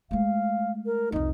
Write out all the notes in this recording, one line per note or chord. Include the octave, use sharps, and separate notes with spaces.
G#3 A3 F5
A#4
C2 F2 D#4